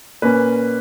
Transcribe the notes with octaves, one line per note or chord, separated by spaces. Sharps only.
A#2 A#3 C#4 B4